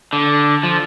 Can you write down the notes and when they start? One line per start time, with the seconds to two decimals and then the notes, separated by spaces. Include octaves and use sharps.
0.13 D3
0.63 F3